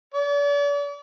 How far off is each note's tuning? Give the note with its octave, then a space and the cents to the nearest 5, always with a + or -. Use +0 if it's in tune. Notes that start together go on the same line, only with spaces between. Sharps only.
D5 -40